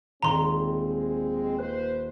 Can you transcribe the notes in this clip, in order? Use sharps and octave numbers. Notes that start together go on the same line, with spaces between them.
D#1 G#3 C4 A#5 C6
D#2 B4 C5 F#6